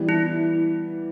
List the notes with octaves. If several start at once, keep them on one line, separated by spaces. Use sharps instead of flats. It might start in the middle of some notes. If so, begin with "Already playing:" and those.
Already playing: E3 G3 B3
E4